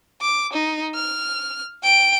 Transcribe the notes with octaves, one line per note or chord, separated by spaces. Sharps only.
D6
D#4
F6
G5 D7